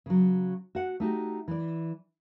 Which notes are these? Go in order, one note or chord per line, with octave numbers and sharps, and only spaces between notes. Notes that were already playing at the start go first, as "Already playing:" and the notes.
C#3 F#3
F#4 F#5
A3 D#4 F#4 G4
E3 D5